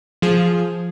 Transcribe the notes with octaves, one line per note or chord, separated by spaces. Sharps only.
F3 G#4